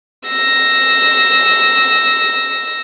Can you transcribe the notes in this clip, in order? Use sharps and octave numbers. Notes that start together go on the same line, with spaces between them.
E6 A#6